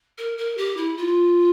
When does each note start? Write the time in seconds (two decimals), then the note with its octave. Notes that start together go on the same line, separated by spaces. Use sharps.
0.18 A#4
0.38 A#4
0.57 G4
0.77 E4
0.97 F4